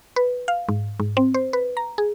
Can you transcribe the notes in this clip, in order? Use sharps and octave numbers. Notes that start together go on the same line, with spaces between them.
B4
F5
G#2
G#2
C4
C5
B4
A#5
G#4